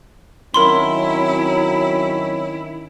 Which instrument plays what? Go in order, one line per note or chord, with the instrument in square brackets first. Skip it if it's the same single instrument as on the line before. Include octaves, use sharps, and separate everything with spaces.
[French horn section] D#3 C#4 [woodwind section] F#3 C4 [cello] E4 [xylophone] A#4 B5 C6